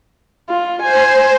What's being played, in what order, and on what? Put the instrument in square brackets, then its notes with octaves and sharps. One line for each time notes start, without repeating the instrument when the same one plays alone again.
[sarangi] F4
[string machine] C5 [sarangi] G#5